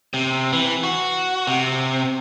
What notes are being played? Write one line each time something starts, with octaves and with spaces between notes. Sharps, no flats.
C3
E3
F#4
C3